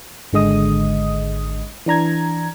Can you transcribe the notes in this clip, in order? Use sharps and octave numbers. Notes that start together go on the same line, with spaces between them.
G#1 D3 G#3 D#5 D#6
E3 D4 A#5 G#6